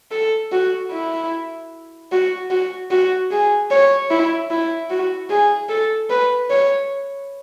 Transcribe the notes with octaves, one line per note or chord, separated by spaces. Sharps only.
A4
F#4
E4
F#4
F#4
F#4
G#4
C#5
E4
E4
F#4
G#4
A4
B4
C#5